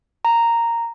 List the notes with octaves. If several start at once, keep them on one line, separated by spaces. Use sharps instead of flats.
A#5